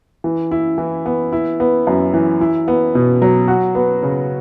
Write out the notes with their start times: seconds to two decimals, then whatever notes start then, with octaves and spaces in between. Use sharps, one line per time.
0.24 E3
0.51 E4
0.78 E3
1.06 B3
1.32 E4
1.60 B3
1.87 F#2
2.14 E3
2.41 E4
2.68 B3
2.95 B2
3.22 F#3
3.48 F#4
3.75 B3
4.03 C#3